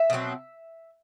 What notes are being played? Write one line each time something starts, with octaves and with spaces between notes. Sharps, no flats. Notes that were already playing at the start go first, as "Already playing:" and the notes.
Already playing: E5
B2 F#3 C4